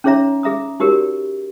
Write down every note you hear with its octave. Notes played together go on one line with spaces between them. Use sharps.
C#4 D#4 G#4 C#5 E5 A#5
G#4 E5 A#5 D#6
D#4 F#4 G4 A#4 C#5